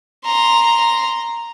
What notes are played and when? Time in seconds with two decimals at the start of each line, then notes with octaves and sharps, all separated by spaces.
0.25 A#5 C6